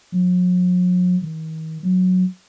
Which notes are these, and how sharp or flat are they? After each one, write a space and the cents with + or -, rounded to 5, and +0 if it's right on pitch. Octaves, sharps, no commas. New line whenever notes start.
F#3 -45
D#3 +40
F#3 -10